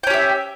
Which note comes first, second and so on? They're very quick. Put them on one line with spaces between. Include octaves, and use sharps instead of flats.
G5 C#4 G4 E5